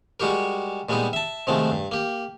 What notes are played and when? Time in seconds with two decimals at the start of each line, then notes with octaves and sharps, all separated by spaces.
0.20 G3 G#3 F#4 G4 A#4
0.89 A#2 G3 G#3 B3 D#4
1.13 E5 A5
1.47 C3 D#3 F3 G#3 A3
1.71 G2
1.91 A#3 G4